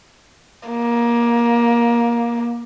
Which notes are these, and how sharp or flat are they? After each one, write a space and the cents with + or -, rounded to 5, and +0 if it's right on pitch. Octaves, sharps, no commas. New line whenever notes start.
A#3 +20